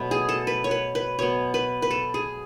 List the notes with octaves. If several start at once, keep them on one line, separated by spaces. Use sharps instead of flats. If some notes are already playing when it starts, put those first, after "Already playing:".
Already playing: B2 F#3 A3 B4
G#4
A4
B4
C#5
B4
B4
B2 F#3 B3 C#5
B4
B4
A4
G#4